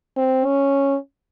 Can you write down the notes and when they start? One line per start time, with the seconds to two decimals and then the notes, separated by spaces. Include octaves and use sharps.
0.17 C4
0.45 C#4